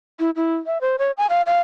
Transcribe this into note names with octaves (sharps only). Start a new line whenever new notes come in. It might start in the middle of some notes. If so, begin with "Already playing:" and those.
E4
E4
E5
C5
C#5
G#5
F5
F5